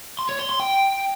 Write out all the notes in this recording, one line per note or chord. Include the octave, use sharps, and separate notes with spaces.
C6
C#5
C6
C6
G5